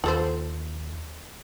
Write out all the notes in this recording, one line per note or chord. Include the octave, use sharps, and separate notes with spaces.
D#2 F4 A4 C5